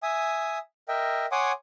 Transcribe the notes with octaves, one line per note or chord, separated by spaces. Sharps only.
E5 G#5 D#6
A#4 D#5 E5 G5
C#5 F#5 G#5 C6 D6 D#6